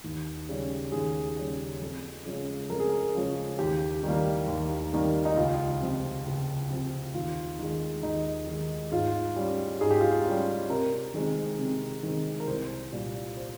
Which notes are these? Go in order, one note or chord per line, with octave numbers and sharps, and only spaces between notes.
D#2
C#3 G3 C#4
D#2 G#4
C#3 G3 C#4
F2
C#3 F3 G#3 C#4
F2 A#4
G#4
A#4
C#3 F3 G#3 C#4
D#2 G4
D#3 G3 A#3
D#2
D#3 G3 A#3
D#4
C#2 F4
C3 F3 C4
C#2
C3 F3 C4
D#2 F4
D#3 G#3
D#2 D#4
D#3 G#3
G#2 F4
G3 C#4
G#2 G#4
G4
F4
G4
G3 C#4
C3 A#4
D#3 G#3 C4
C3
D#3 G#3 C4
A#4
C2 C5
A#2 G3
C5